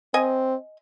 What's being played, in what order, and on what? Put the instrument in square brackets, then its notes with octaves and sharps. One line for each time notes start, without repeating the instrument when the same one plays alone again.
[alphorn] C4 [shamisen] D#5 G#5